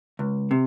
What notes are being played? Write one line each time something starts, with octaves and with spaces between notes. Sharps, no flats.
C#2
C3